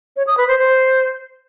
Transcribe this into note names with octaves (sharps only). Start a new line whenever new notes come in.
C#5
D#6
B4
C5
C5